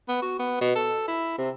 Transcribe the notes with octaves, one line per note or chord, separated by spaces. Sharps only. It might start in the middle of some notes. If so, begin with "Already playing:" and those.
B3
F#4
B3
B2
A4
E4
C3